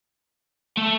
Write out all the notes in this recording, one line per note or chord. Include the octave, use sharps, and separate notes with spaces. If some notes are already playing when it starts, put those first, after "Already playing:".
A3